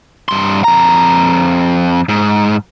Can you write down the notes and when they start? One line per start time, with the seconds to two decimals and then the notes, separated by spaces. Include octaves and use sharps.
0.29 G2 C6
0.64 F2 A#5
2.09 G#2